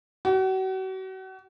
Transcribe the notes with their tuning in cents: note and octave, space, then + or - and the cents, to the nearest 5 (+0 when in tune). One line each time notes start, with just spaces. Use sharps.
F#4 +40